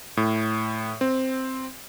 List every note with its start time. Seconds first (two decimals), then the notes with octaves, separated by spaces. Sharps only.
0.17 A2
1.01 C4